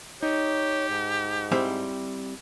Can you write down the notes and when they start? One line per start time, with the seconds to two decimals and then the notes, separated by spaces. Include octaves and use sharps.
0.23 D#4 G4 C#5
0.90 G#2
1.52 G3 C4 E4